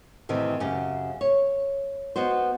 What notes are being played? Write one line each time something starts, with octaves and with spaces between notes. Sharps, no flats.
A2 C3 D#3 E3
F#2 C#3 G4
C#5
B3 D#4 F#4 C5